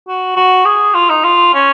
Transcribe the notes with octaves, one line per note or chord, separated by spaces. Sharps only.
F#4
F#4
G#4
F4
D#4
F4
C#4